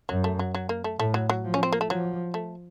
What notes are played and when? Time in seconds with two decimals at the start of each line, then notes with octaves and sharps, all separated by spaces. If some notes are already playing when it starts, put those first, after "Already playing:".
0.09 F#2 F#3
0.24 A3
0.39 F#3
0.54 F#3
0.69 A#3
0.84 A3
0.99 A2 A3
1.14 F#3
1.29 F#3
1.44 F3
1.54 C#4
1.63 C4
1.72 A#3
1.81 A3
1.89 F3 F#3
2.34 A3